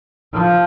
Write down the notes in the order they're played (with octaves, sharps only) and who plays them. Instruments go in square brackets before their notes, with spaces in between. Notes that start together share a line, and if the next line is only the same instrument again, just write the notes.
[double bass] F3